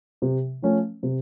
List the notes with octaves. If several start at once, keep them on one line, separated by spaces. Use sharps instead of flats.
C3
F3 A3 C#4
C3